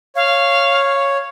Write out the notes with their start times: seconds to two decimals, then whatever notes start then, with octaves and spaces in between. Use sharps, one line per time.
0.15 C#5 F5